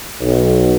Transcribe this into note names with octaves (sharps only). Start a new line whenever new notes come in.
B1